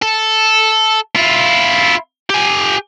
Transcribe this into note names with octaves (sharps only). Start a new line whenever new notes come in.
A4
E4 F4
G4 G#5